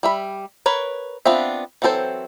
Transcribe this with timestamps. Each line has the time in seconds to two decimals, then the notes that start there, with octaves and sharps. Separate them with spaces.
0.03 G3 E5 B5
0.66 A#4 B4 C#5
1.25 B3 C4 D4 F4 E5
1.82 E3 F#3 C4 A4 C5